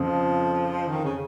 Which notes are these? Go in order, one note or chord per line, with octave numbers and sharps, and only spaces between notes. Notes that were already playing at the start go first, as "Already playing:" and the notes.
Already playing: F2 C#3 F3
D#3
C#3